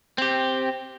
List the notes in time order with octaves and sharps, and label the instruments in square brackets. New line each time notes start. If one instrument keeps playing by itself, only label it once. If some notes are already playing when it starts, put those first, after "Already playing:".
[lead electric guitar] C4 G4